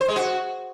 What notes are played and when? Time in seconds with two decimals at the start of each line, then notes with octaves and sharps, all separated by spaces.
0.01 C5
0.08 G#3
0.16 F#4